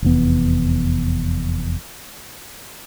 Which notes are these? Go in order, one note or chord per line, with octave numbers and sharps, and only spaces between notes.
F1 E2 B3